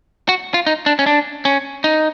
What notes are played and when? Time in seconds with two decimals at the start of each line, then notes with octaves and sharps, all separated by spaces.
0.29 F#4
0.54 F4
0.67 D#4
0.86 D4
0.99 C#4
1.06 D4
1.45 C#4
1.84 D#4